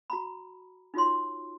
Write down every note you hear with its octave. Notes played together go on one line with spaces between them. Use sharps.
F#4 A#5 B5
D#4 F4 F#4 C#5 C6